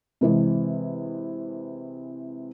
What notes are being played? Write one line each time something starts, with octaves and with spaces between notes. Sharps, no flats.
C3 E3 G#3